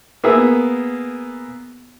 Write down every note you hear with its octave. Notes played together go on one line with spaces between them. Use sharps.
A#3 B3 G#4 E5